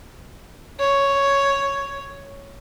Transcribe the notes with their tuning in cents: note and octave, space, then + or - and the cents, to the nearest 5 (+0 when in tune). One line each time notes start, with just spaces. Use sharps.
C#5 +0